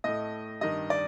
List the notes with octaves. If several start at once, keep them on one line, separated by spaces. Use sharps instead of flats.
A2 A3 D#5
G2 D#3 G3 D#5
D5